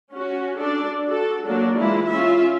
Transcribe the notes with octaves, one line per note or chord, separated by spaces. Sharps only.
C#4 F#4
D4 A4 D5
F#4 A4
F#3 A#3 D4 F#4
E3 G#3 E4 F4
C#4 F4 E5